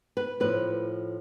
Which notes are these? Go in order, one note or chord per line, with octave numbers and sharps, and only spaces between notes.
B4
A2 F3 B4